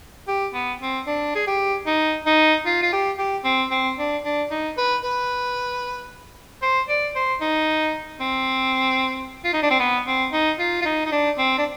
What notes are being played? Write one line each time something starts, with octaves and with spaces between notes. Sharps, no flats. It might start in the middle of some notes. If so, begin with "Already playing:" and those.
G4
B3
C4
D4
G#4
G4
D#4
D#4
F4
F4
G4
G4
C4
C4
D4
D4
D#4
B4
B4
C5
D5
C5
D#4
C4
F4
D#4
D4
C4
B3
C4
D#4
F4
F4
D#4
D#4
D4
C4
D4